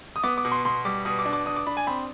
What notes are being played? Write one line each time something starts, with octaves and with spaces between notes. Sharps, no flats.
D#6
B3 D6
D6
B2
C6
B2 C6
G3 D6
B2 D#6
D6
D4
D6
D4 D#6
D6
D4 B5
G#5
C4 B5